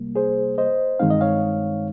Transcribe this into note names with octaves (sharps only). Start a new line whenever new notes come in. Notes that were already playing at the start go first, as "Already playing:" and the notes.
Already playing: C2 C3 G3 A#3
G#4 C5
C5 D#5
G2 D#3 G#3 C4 D#4 F5
D#5
C#5 F5